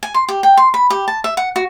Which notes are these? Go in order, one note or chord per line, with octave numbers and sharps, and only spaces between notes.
G#5
C6
G4
G5
C6
B5
G4
A5
E5
F#5
F#4